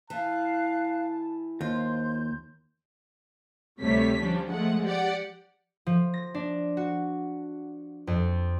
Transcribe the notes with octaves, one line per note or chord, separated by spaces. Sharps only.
E3 F5 A5 F#6
D#2 F4 C5 C6 G6
D2 C3 G3 A3 C#5 B6
F3 G3 C#4 D4
F3 G#3 A3 F#5
G4 D5 F#5
F3
A#6
D4
F#4
F2